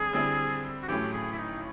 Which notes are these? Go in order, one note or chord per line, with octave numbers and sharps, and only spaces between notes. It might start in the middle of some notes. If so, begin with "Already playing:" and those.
Already playing: D3 G3 C4 E4 G#4
D3 G3 C4 E4
F#4
A1 A2 F#3 A3 C#4 G4
G#4
E4
D#4